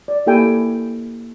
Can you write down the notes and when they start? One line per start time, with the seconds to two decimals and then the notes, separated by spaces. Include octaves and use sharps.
0.08 D5
0.27 A#3 E4 G4 A4 G5 G#5